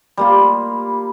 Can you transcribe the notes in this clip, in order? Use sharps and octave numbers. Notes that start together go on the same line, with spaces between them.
G3 A#3 F4